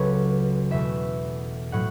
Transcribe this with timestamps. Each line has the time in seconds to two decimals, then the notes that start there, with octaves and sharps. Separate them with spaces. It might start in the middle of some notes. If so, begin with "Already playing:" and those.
Already playing: C#2 C#3 F#3 B3 A4 B4 C#5
0.70 E2 B2 A3 E5
1.72 A2 F#3 F#5